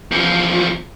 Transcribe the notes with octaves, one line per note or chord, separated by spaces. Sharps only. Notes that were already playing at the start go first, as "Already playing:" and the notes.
E2 F3